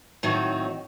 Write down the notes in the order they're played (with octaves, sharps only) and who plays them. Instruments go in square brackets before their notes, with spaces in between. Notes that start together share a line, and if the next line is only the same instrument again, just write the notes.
[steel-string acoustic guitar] A2 D#3 F#3 C4 D#4 F#4